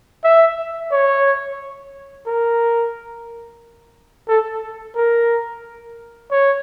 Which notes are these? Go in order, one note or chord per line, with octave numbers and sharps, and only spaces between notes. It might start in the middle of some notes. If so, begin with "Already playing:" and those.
E5
C#5
A#4
A4
A#4
C#5